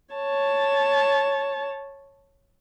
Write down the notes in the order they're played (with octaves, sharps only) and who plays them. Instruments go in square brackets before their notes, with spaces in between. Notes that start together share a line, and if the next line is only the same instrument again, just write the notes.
[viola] C#5 A5